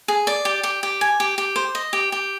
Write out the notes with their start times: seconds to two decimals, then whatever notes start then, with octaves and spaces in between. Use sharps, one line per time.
0.08 G#4
0.27 D5
0.45 G4
0.63 G4
0.83 G4
1.01 G#5
1.20 G4
1.38 G4
1.56 C5
1.75 D#5
1.93 G4
2.12 G4